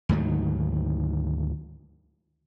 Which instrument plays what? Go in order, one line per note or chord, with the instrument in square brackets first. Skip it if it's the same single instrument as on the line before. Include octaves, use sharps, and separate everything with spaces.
[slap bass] D2 G#2 D#3 F#3